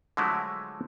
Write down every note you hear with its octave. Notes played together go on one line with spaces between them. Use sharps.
D3 F3 F#3 G#3 A3 E4